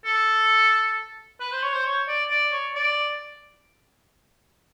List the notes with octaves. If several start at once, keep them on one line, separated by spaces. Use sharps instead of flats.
A4
B4
C5
C#5
C5
C#5
D5
D5
C#5
D5